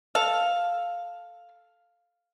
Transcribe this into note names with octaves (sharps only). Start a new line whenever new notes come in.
A4 F5